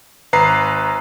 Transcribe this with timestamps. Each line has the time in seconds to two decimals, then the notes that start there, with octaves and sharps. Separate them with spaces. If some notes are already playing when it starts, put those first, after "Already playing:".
0.33 G#1 B4 A#5 C7